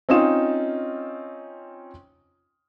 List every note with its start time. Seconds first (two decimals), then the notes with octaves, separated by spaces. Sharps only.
0.09 C4 C#4 D#4 F4 D#6 E7